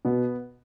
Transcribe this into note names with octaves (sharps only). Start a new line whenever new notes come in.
B2 B3